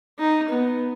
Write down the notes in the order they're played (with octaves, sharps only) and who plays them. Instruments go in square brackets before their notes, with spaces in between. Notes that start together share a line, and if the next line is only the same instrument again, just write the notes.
[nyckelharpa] D#4
B3